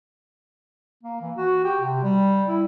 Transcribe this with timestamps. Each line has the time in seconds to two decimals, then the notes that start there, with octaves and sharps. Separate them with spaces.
1.03 A#3
1.21 E3
1.37 F#4
1.64 G4
1.81 C3
2.03 G3
2.48 E4